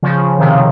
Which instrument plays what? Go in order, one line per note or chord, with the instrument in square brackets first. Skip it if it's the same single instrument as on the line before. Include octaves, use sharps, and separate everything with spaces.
[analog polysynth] C#3 F3
C3 D#3